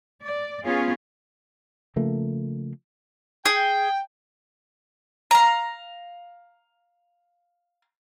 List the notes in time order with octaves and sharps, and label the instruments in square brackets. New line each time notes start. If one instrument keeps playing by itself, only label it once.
[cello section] D5
B3 C#4 F4 G#4 C#5
[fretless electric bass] C#3 F3 A3 A#3
[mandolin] G#4 [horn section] G5
[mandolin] F5 A#5